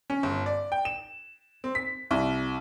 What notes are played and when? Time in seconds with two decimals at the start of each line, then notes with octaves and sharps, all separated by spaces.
0.10 C#4
0.23 G1
0.46 D5
0.72 G5
0.85 E7
1.64 C4
1.75 B6
2.11 C2